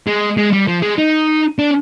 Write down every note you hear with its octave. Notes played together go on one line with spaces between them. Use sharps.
G#3
G#3
G3
F3
G#3
D#4
D4